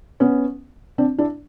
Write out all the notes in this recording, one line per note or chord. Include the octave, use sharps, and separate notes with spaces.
B3 C#4
C4 D4
D4 E4